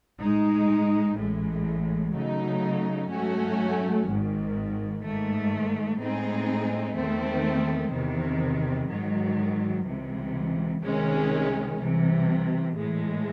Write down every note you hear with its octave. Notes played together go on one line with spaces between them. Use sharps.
A2 G#3 D#4
A1 A2 G#3
C#3 F#3 A3 D#4
G#2 F#3 A3 C#4 F#4
G#1 G#2 D#3
G#2 D#3 A3
A2 G#3 C4 D#4 G#4
E2 D#3 A3 C4
E2 C3 D#3
G#2 D#3 F#3
C#2 C3 E3
C2 C3 D#3 G#3 C#4
C2 C3 E3
A2 E3 G#3